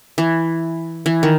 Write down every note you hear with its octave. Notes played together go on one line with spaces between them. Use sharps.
E3
E3
D#3